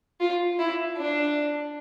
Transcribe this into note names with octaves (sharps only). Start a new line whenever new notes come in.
F4
E4
D4